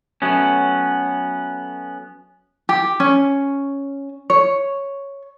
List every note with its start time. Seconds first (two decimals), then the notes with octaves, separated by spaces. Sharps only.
0.22 F#3 A3 B3 C#4
2.69 G4
3.00 C#4
4.30 C#5